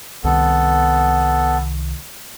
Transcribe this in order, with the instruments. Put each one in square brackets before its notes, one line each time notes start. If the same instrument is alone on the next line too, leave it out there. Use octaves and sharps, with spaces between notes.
[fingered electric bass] C2 D#3 [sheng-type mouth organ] B3 A4